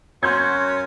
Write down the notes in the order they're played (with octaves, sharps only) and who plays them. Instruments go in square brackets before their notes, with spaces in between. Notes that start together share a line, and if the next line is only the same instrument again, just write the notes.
[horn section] F#2 C#4 F#4 [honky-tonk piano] C6 G6 G#6